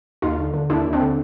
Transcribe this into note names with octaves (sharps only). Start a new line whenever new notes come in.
D#2 D#4 F4
D3
D3
D#2 D4 E4
D#2
C4 D4
D3